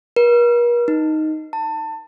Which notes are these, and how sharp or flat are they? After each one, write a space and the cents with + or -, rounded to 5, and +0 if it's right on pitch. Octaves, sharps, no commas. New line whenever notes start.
A#4 +45
D#4 +0
A5 +25